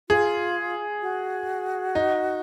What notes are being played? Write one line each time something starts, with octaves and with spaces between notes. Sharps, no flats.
F4 G#4
F#4
D#4